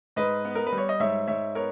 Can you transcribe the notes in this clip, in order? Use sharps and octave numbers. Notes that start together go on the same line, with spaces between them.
G#2 B4 D#5
B3
A#4
B4
G3
C#5
D#5
G#2 C#5 E5
G#2 C#5 E5
B3 A#4 C#5